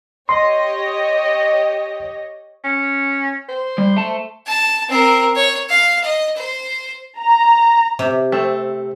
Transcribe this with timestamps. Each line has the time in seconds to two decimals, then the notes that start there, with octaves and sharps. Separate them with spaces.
0.29 G4 C#5 D#5 C6
2.64 C#4
3.49 C5
3.78 G3
3.96 A3 A5
4.47 A5
4.89 C4 A#4
5.36 C#5
5.70 F5
6.04 D#5
6.37 C5
7.19 A#5
7.99 C3
8.32 A3 C4